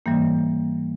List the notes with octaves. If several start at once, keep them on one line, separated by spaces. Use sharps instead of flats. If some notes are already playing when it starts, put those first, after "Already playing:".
G#2 E3 G3 A#3